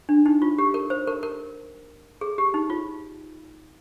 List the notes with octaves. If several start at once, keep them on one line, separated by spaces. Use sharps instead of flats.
D4
D#4
F4
G4
A#4
C5
A#4
A#4
G#4
G4
D#4
F4